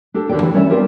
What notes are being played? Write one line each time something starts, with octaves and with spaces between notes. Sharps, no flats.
D4 G4 A4
D#2 D4 G4 C#5 D5 G5
E3
G3 C#4 C#5 D5 E5
B3 C4 D4 F4 G4 A#4